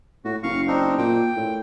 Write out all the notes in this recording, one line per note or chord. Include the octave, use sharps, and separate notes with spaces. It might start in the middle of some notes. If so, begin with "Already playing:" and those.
A2 F#4
F#1 F5 C#6
C4 D4 D#4
A#2 G5
A2